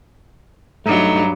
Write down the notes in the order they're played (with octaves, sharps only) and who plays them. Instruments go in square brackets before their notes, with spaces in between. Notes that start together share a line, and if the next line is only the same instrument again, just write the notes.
[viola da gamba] G2 F#3 [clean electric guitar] A3 D#4 [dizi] A#5